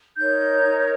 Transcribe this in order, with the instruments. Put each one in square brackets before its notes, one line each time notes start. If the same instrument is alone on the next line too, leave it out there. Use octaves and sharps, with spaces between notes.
[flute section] D#4 A#4 C#5 G6